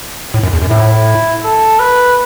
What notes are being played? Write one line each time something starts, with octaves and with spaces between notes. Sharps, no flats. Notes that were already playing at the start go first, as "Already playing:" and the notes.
A2
F#2
E2
F#2
A2 E4
A4
B4